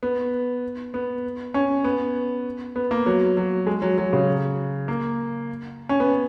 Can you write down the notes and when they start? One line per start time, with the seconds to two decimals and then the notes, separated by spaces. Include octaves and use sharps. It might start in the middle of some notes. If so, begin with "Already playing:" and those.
0.03 B3
0.94 B3
1.54 C#4
1.84 B3
2.76 B3
2.91 A#3
3.06 F#3
3.37 F#3
3.67 G#3
3.82 F#3
3.98 F#3
4.13 C#3
4.88 A#3
5.89 C#4
6.00 B3